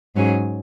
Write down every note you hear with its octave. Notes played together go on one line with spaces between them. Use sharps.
G#2 F#3 C#4 G#4